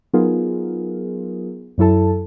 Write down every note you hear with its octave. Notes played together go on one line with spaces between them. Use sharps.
F#3 B3 D#4 F4 G#4 A#4
F#2 F#3 E4 A4 A5